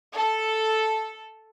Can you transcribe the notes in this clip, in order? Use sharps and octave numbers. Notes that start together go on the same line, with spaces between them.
A4